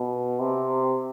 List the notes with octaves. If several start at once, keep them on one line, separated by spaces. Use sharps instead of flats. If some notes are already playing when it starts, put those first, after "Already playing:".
Already playing: B2
C3